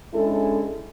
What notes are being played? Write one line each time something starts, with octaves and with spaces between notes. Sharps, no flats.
G#3 C#4 D4 E4 A4